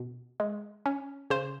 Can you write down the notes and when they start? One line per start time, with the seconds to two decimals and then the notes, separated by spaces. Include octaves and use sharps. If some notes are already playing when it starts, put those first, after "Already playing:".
Already playing: B2
0.40 G#3
0.86 C#4
1.30 C#3 C5